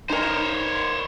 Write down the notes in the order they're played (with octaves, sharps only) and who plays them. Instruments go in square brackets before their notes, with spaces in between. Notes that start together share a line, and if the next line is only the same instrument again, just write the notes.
[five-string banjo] D#4 A#4 [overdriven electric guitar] C5 C#5